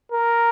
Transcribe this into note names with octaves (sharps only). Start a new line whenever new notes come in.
A#4